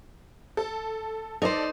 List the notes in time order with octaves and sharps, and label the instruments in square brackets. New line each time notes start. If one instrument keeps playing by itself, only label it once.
[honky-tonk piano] A4
[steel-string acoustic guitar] D#4 C5 [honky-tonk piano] A4 D5